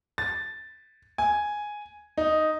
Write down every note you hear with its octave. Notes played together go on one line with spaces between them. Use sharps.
A6
G#5
D#4